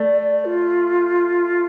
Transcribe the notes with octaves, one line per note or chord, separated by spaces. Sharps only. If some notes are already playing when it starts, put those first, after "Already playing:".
Already playing: A3 D5
F4